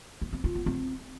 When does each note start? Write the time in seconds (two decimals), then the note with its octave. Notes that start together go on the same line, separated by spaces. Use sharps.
0.22 B3
0.33 C4
0.44 F4
0.55 B3
0.66 C4